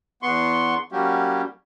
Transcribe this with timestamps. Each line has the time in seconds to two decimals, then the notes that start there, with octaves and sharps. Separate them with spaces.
0.23 E2 B3 C6 C#6
0.92 F#3 G3 A#3 C#4 F#4 G4